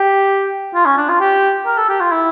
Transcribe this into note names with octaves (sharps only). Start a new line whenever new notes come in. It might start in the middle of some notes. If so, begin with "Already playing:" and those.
Already playing: G4
F4
C#4
D4
F4
G4
A#4
A4
G4
F4
E4